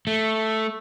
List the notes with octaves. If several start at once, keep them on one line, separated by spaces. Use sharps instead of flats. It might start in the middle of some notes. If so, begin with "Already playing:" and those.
A3